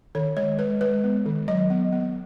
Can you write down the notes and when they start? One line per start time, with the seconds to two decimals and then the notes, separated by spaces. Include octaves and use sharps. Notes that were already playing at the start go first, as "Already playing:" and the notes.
0.15 D#3 C#5
0.37 G#3 C#5
0.59 G#3 B4
0.81 G#3 B4
1.04 B3
1.26 D#3
1.48 F#3 D#5
1.70 B3
1.92 B3